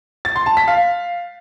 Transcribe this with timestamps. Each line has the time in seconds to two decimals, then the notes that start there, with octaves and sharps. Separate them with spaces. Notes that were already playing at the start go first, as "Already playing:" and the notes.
0.25 A6
0.36 C6
0.46 A5
0.57 B6
0.68 F5